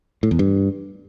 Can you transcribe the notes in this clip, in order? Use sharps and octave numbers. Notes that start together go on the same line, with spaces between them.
A2
E2
G2